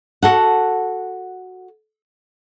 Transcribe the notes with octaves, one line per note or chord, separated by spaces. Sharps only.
F#4 A4 F#5